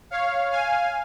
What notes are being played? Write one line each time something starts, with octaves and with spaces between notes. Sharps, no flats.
C#5 F5
F5 G#5